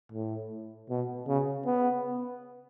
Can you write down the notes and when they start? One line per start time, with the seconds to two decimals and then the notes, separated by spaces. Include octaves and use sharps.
0.12 A2
0.90 B2
1.28 C#3
1.66 B3